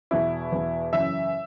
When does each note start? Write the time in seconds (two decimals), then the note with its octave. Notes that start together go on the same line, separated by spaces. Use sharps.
0.11 E2 B2 E4
0.52 E2 B2
0.93 F#2 C#3 E3 E5